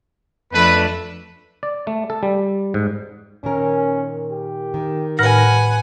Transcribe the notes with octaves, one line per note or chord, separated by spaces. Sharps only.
F2 A3 D4 B4
D5
A3
A4
G3
G#2
A#2 D#3 C#4 A#4
G4
D#3
A2 B4 F#5 G#5 F6 A#6